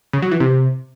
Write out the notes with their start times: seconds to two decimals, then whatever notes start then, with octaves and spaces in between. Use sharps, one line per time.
0.13 C#3
0.22 F#3
0.31 E3
0.40 C3